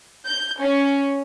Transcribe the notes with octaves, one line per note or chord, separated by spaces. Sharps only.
G6
C#4